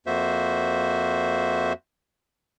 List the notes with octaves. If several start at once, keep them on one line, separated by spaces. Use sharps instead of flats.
F2 A#3 F#4 C5 E5